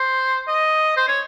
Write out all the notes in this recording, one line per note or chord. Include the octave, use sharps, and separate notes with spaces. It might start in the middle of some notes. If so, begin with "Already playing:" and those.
Already playing: C5
D#5
C5
C#5